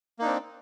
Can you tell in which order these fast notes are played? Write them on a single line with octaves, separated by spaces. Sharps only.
A#3 D#4 D4 C4